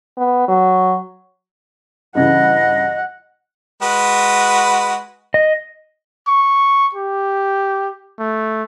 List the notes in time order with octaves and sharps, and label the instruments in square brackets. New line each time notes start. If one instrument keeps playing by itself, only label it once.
[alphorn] B3
F#3
[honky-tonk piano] G2 C#3 E3 [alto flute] D#5 [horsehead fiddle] F#5
[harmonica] G#3 F#4 B4
[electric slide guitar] D#5
[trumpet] C#6
G4
A3